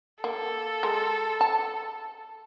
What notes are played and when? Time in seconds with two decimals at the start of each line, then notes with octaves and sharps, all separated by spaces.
0.24 A#3 A4
0.83 G#3 A#4
1.41 A5